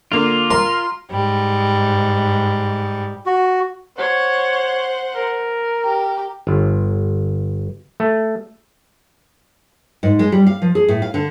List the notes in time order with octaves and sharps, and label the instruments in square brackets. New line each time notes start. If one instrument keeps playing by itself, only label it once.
[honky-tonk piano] D3 A#3 [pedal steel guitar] F4
[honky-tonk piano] A#4 [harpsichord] C6
[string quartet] G#2 G3
[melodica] F#4
[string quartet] C5 F#5 [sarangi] C#5
[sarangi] A#4
[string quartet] G4
[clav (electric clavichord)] G1
A3
[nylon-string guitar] G#2
G#3
G3
F5
F3
G#4
A2
F5
D3